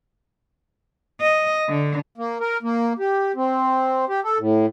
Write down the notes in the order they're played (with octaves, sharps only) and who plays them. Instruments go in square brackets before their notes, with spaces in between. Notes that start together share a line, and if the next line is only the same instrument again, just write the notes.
[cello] D#5
D3
[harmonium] A#3
A#4
A#3
G4
C4
G4
A4
A2